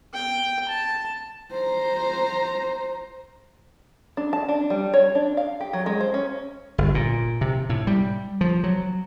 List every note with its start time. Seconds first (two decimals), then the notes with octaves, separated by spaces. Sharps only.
0.14 G5
0.69 A5
1.51 C5 A#5
4.17 D4
4.33 A5
4.49 D4
4.70 G3
4.94 C#5
5.15 D4
5.37 F5
5.60 G4
5.73 F#3
5.86 G#3
6.00 C5
6.14 C#4
6.78 G1
6.95 A#2
7.41 C3
7.69 A2
7.87 G3
8.41 F3
8.64 F#3